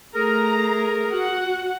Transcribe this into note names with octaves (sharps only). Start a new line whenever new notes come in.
A3 G#4 A#4 A#5
F#4 F#5